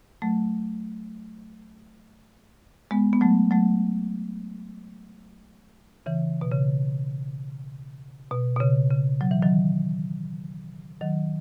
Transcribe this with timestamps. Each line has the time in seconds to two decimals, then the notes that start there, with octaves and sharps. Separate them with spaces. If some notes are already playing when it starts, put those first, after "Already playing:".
0.22 F#3 A3
2.91 G#3 B3
3.13 B3
3.21 F#3 A3
3.51 F#3 A3
6.06 C#3 E3
6.41 B2
6.51 C#3
8.31 B2
8.56 B2
8.60 C#3
8.90 C#3
9.21 F#3
9.31 E3
9.42 D#3 F#3
11.01 D#3 F#3